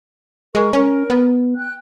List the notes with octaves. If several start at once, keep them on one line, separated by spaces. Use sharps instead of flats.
G#3 A#4 C#6
C#4 A#4
B3
G5 F#6